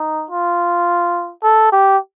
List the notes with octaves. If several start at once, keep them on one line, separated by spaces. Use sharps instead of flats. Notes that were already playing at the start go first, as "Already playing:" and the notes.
Already playing: D#4
F4
A4
G4